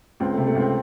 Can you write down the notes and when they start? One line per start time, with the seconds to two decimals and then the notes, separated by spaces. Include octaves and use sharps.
0.20 C#2 C4
0.34 C3 A3
0.47 A3
0.55 C#2 C4